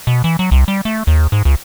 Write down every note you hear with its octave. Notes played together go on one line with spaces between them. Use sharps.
B2
E3
F#3
C2
G3
A3
D#2
G#2
C#2